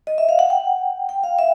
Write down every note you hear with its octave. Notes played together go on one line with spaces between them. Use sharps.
D#5
E5
F5
F#5
G5
G5
F5
E5